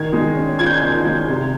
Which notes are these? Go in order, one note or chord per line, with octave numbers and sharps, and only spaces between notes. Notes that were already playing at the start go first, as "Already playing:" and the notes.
Already playing: D#3 G#6
G#3
C#4
F4 G#6
G6
G#6
D#3
G#3
C3